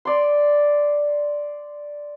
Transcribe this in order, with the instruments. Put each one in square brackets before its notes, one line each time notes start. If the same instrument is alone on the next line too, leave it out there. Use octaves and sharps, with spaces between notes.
[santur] D5 C6